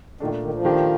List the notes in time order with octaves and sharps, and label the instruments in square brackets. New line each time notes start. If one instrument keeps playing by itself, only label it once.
[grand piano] A#2 A3 D4 [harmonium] D#3
[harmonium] D#3
F3
[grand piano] D#3 A3 D4 G4 C5